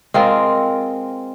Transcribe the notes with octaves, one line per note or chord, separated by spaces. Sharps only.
G#3 C4 F4 A#4